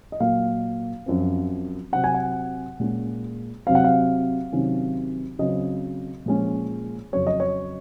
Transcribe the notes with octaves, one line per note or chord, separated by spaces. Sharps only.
D#5
A#2 F#3 A#3 F5
F#2 F3 C4
C3 F#3 C4 F#5
G#5
F#5
A#2 G#3 C#4
C3 F#3 C4 F5
F#5
F5
C3 D#3 F#3 C#4
C#3 F#3 C4 D#5
A#2 F3 G#3 C#4
F2 C#3 F#3 C#5
D#5
C#5